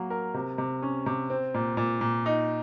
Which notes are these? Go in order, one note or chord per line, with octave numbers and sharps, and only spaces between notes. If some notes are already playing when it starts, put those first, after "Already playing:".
Already playing: F#3 A#3
A#4
C3
C3
C#4
C3
C4
A#2
A#2
A#2
D#4